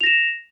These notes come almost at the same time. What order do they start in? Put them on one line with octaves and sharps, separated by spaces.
F7 A#6 E7